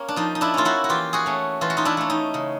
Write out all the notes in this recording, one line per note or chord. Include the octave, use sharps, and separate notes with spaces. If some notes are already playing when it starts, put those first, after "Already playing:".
Already playing: A#3 C#4
D4
F3 D#4
D#4
D4 E4
A#3 C#4 F4
E4 F#4
F#4
E3 F4 G4
F#4 G#4
A3 C#4
E3 F4
F#4
D#4 F4
D4 E4
A3 C#4
D#4
C#3